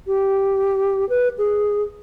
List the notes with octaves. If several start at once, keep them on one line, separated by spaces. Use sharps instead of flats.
G4
B4
G#4